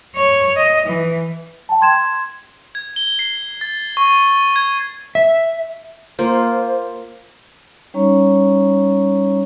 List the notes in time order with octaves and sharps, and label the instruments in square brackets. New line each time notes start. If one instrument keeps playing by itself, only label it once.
[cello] C#5
D#5
E3
[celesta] G5 A5
C6 G#6 E7
[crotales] G#6
G7
C7
A6
C#6
G#6
[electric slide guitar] E5
[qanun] A#3 F4 [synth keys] C5
[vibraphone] G3 C#4 D#4 C#5 A#5 C#6